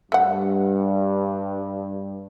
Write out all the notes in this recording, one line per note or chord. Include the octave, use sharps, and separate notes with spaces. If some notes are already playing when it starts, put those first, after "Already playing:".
G2 A3 F#5